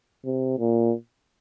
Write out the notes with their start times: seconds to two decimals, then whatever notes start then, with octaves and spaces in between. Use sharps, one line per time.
0.25 C3
0.59 A#2